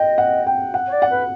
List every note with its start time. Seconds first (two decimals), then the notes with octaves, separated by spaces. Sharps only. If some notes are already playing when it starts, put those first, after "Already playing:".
Already playing: D#5 G5
0.18 F#5
0.47 G5
0.74 F#5
0.87 C#5
0.92 D5
1.02 F#5
1.10 B4